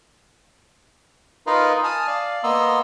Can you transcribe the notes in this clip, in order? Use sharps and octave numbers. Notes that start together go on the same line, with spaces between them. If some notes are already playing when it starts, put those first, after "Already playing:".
D#4 F4 A#4 B4 D#5 F5
G#5 A5 D#6 F6
D5 F5
A#3 B3 D#5 A#5 C6 E6